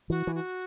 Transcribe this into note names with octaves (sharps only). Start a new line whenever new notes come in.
E3 F#4
E3
F#4